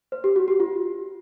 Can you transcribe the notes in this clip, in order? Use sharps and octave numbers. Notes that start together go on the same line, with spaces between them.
C5
G4
F#4
G4
F4